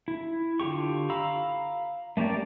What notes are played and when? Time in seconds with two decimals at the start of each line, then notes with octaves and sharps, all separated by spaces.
0.08 E4
0.60 D3 F4 G4 C#6
1.10 F5 A#5 B5 E6
2.17 A3 A#3 C#4 G4 D5